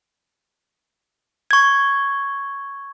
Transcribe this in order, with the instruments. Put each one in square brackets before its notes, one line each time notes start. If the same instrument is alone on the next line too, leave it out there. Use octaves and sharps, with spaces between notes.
[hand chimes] C#6 G#6